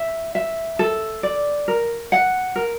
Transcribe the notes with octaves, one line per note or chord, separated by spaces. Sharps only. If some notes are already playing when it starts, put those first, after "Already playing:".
Already playing: E5
E5
A4
D5
A#4
F#5
A#4